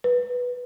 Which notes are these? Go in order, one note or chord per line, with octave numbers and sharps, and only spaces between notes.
B4